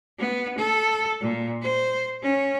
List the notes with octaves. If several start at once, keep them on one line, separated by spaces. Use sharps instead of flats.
B3
A4
A#2
C5
C#4